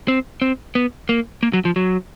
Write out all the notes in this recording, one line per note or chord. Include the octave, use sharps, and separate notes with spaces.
C4
C4
B3
A#3
A#3
F#3
F3
F#3